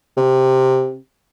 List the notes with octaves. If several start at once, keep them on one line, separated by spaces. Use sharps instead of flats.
C3